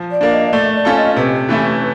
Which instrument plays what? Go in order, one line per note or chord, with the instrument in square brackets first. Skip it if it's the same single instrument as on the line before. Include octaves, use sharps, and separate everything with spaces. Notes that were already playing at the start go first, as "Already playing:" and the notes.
Already playing: [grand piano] F3
[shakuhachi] D5
[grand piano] A#3 D4
[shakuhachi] D#5
D#5
[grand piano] A3 [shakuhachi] D5
[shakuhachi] D5
[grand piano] C#4 F4 A4
[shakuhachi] D#5
[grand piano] C3 [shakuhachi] B4
[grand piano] E3 A3 C#4 E4